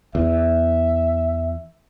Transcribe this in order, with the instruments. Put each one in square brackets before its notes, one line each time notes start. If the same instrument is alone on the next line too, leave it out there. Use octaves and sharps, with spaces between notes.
[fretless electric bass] E2 [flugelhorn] E5